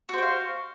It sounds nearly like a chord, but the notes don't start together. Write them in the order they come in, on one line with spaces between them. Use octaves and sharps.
F#4 C5 G5 F5